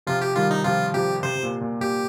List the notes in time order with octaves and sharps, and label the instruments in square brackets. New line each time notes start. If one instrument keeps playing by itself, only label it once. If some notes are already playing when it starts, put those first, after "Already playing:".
[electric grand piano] C3 F3 [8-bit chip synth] F4
[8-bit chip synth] G4
[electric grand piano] D#3 G3 [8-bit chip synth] F4
[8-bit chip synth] D#4
[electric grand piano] C3 F3 [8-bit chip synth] F4
[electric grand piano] C3 F3 [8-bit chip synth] G4
[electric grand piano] C3 [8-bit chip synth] C5
[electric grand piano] C3
A#2
A#2
[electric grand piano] A#2 [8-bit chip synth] G4